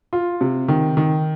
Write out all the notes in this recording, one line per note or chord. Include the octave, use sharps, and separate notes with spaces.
F4
C3
D#3
D#3